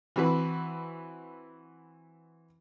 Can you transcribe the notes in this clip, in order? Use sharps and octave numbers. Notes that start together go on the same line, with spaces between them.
E3 C4 F#4 B4